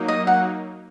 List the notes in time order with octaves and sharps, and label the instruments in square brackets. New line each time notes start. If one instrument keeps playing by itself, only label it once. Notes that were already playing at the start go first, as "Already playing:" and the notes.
Already playing: [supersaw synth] F#3 A#3 D#4
[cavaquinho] D#5
F#5